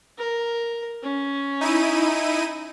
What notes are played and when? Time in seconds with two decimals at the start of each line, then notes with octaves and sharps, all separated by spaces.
0.18 A#4
1.03 C#4
1.61 D#4 E4 D#7